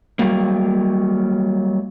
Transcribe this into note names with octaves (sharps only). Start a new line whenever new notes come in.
F#3 G3 A#3